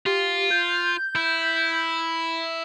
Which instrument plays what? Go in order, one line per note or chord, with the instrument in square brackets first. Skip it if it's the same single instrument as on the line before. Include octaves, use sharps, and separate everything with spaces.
[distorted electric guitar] F4 [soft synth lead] G4
[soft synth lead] G6
[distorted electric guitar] E4